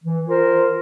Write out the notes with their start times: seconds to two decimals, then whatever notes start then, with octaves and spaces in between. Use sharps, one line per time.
0.03 E3
0.27 F4 A#4 C5